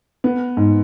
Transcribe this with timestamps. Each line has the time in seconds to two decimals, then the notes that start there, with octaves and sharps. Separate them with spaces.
0.24 B3
0.57 G#2